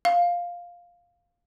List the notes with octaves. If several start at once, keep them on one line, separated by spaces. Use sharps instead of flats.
F5